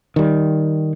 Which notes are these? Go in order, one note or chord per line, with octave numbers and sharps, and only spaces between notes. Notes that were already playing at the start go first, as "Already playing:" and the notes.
D#3 G3